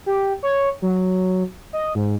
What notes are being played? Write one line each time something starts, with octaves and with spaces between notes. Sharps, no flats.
G4
C#5
F#3
D#5
G#2